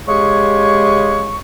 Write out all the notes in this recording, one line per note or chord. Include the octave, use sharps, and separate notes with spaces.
C#3 G#3 G4 G#4 C#6